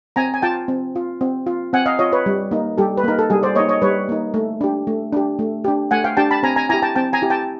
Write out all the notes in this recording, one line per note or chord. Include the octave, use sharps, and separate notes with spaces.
C4 G#5 A#5
G#5
F4 G5 A5
C4
F4
C4
F4
C4 F#5 G#5
D#5 F5
F4 C#5 D#5
B4 C#5
G3
A#3 D#4
G3 G4 A4
B4
A#3 D#4 A#4
A4
G3 G#4
C5 D5
A#3 D#4 C#5 D#5
C#5 D#5
G3 B4 C#5
A#3 D#4
A3
D4 G4
A3
D4 G4
A3
D4 G4
A3 F#5 G#5
F5 G5
D4 G4 G5 A5
A5 B5
C4 G#5 A#5
G#5 A#5
E4 G4 G#5 A#5
G5 A5
C4 G5 A5
G#5 A#5
E4 G4
G5 A5